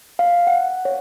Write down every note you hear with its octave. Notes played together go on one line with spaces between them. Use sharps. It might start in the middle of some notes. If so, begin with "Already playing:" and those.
F5
F#5
C#5